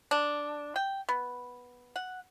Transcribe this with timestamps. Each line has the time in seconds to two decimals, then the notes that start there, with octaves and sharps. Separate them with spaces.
0.11 D4
0.76 G5
1.09 B3
1.96 F#5